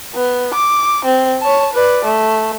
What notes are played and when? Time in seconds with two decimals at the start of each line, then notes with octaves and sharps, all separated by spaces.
0.15 B3
0.54 D6
1.05 C4
1.41 C#5 A5
1.73 B4 D5
2.05 A3